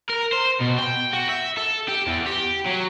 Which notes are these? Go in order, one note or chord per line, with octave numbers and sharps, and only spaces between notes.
A#4
C5
B2
G5
F#4
E5
A4
G4
E2
G4
F#3